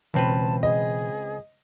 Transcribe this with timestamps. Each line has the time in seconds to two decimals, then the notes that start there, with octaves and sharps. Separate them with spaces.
0.14 C#2 B2 E3 C4 B4 A5
0.63 G#4 D#5